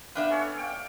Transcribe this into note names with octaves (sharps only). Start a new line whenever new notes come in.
B3 D4 E5 F5 G5
C#4 A4 C#5
F5 G5 D6